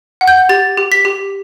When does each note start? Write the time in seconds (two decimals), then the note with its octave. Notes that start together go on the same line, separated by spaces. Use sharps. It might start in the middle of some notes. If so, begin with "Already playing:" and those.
0.21 F#5
0.28 G6
0.49 G4 A6
0.77 G4
0.92 B6
1.05 G4